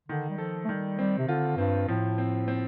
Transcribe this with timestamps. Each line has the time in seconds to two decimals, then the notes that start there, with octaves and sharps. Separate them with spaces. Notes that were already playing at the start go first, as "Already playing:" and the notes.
0.08 D3 D#3
0.30 G3
0.38 F3 A4
0.65 A3
0.68 D#3 G3
0.99 G3 C4
1.19 C3
1.28 D3 F4
1.58 G2 C4
1.88 A2 F3
2.18 C4
2.48 C4